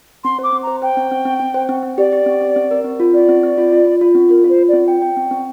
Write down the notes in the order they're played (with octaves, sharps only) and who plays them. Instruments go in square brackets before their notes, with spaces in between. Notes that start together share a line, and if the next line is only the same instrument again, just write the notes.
[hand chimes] C4 [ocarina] C6
[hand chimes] C5 [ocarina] D6
[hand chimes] C4
[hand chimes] C5 [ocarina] A#5
[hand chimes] C5 [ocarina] G5
[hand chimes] C4
C4
C4
C4
C5
C4
C4
[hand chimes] G4 [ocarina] D5
[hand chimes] G4
C4
C4
C4
A#4
C4
F4
[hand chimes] C4 [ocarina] D5
[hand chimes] C4
C4
F4
F4
F4
F4
C4
[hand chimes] F4 [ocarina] A#4
[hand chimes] F4 [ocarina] C5
[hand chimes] F4
[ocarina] D5
[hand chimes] C4
G5
G5
C4
C4